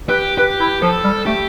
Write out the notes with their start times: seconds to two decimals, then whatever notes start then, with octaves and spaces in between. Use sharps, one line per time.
0.09 G4 B4
0.38 G4 B4
0.60 E4
0.82 F3 A4
1.04 G3
1.26 A3 G4